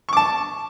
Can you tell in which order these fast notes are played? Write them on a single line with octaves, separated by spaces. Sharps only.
C#6 D6 A5